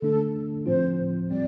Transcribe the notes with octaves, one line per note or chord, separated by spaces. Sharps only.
D3 A3 D4 A4
A2 F3 C4 F4 C5
G3 C4 D5